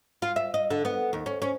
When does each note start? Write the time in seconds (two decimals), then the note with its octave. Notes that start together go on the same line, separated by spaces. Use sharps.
0.22 F4
0.36 E5
0.54 D#5
0.70 D3
0.85 B3
1.13 D#2
1.26 C#4
1.42 C#4